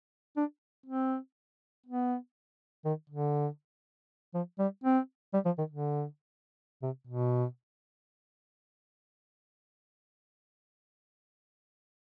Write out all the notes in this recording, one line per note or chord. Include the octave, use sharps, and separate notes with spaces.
D4
C4
B3
D#3
D3
F3
G3
C4
G3
F3
D#3
D3
C3
B2